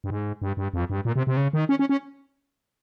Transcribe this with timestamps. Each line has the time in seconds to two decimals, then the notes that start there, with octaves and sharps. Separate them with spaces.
0.04 G2
0.10 G#2
0.42 G2
0.57 G2
0.74 F2
0.90 G2
1.05 A#2
1.16 C3
1.27 C3
1.37 C#3
1.53 D#3
1.69 C#4
1.79 C#4
1.89 C#4